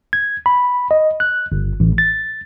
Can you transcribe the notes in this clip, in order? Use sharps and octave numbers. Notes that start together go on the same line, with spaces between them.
G#6
B5
D#5
F#6
G1
A1
A6